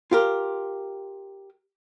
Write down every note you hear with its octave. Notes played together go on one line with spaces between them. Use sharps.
F4 G4 A#4